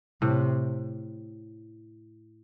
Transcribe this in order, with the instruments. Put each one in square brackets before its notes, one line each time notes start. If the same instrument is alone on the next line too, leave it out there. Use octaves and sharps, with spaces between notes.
[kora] A2 [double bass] C3